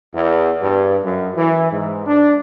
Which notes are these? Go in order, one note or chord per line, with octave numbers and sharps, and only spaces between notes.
E2
G2
F#2
E3
G#2
D4